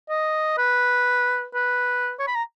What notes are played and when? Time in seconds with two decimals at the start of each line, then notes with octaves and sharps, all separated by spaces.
0.09 D#5
0.58 B4
1.54 B4
2.19 C#5
2.27 B5
2.35 A#5